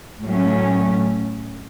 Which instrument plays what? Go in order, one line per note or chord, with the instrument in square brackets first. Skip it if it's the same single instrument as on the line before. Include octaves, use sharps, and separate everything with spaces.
[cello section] A2 F#3 A3 C#4